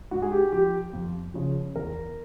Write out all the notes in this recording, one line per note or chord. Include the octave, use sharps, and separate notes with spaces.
G#2 F#4
G#4
G4
F3 G4
F2
C#3 F3
E2 A#4